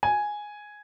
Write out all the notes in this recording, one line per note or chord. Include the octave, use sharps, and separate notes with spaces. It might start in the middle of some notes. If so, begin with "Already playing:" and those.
G#5